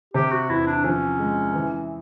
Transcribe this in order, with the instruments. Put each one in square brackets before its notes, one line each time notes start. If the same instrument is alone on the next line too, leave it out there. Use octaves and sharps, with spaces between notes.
[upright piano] C3 [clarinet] G4
[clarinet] F#4
[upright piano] E2 [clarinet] E4
[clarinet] D4
[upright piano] F3 [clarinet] C#4
[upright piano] G#3
E3